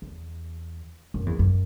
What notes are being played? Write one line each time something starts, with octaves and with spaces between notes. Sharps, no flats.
E2
F#2
E2
F#2